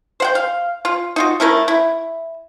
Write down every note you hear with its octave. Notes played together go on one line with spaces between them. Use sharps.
C5 F#5 G5
F5
F4
D#4 F4 F#4
A3 C#4 E4 A#4
E4